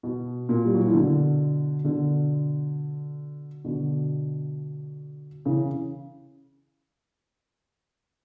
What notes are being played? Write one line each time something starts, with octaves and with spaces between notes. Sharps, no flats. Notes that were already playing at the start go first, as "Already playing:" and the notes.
B2
A#2
G3
F#3
E3
B2 D3
B2 D3
B2 D3
C#3 E3